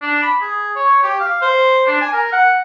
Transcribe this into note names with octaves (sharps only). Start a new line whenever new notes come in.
D4
B5
G#4
C#5
G4
F5
C5
D4
G#5
A#4
F#5